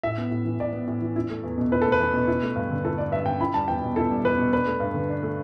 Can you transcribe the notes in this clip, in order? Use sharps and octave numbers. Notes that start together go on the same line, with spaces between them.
A2 E5
B3
A2
E3
A2 D5
B3
A2
E3
E4
A3
E2
B2
E4 B4
A3 A4
B4
E2
B2
E4
A3
G2
D3
E4 A4
A3 D5
G2 E5
D3 G5
E4 B5
G3 A5
E2 G5
B2
E4 A4
G3
E2 B4
B2
D4 B4
A3
G2
D3
D4
A3